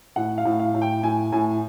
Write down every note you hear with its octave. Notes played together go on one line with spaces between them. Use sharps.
A2 F#5
F5
A2
F5
A2
G5
A2 G#5
A2 G#5